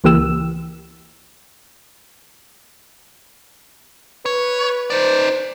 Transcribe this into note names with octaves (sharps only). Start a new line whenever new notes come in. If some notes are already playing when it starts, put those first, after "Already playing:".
C#2 E3 A#3 G4 E6
B4 C#5
D#4 C5 D5